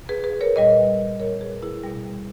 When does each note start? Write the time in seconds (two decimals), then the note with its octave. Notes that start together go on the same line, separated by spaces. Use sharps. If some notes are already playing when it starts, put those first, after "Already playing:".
Already playing: B2
0.09 G#4 B4
0.24 G#4 B4
0.41 A#4 C#5
0.56 A#2 G3 B4 D#5
1.20 A#4 C#5
1.41 G#4 B4
1.62 E4 G#4
1.84 B2 G3